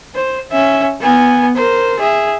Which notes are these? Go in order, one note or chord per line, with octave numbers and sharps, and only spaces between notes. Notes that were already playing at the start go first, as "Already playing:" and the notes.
C5
C#4 E5
B3 G#5
A#4 C5
G#4 E5